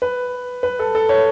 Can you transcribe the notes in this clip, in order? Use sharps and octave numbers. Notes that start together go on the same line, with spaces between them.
B4
B4
A4
A4
C#5